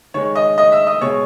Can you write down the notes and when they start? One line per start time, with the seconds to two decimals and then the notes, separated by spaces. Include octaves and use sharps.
0.14 D#3 G#3 C#5 C#6
0.35 D#5 D#6
0.58 D#5 D#6
0.72 E5 E6
0.87 D#5 D#6
1.01 B2 G#3 C#5 C#6